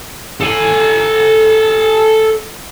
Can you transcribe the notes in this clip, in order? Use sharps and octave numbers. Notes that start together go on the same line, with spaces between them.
A4 G#5